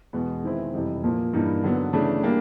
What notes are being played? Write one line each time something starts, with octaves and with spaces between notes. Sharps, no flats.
E2 B2 G#3 B3
D#3 G#3 C4 E4
F2 C3 E3 G3
A#2 F3 A#3
G2 E3 G3 A#3 D#4
D3 F#3 B3
C#3 E3 A3 D4
G3 A#3 D4 G4